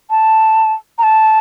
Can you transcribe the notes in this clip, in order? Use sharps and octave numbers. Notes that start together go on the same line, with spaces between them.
A5
A#5
A5